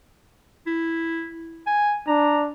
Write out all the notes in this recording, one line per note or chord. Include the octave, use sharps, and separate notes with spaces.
E4
G#5
D4 A#5